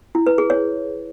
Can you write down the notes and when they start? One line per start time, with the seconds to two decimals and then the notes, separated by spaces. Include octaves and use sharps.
0.15 E4
0.27 B4
0.38 G#4
0.50 C#5